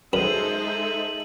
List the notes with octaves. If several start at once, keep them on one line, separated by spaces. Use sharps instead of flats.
F#2 G#3 D#4 A4 C5 E5 D#7 F#7